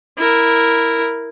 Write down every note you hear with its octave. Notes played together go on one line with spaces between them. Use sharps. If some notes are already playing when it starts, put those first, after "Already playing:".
E4 A#4